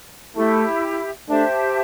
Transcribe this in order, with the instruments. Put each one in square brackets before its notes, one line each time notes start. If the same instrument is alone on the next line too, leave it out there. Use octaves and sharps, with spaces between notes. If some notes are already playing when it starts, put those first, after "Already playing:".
[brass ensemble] A3 [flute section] E4 G4 E5
[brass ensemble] A3 D4 [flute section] G4 C5 E5 A5